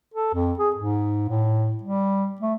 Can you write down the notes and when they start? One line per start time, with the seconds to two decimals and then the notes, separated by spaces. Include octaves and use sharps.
0.14 A4
0.34 F2
0.59 G#4
0.76 G#2
1.29 A2
1.83 G3
2.41 A3